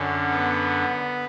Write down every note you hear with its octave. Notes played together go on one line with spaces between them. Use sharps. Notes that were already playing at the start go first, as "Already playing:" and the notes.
Already playing: F#2 D3 C#4
B3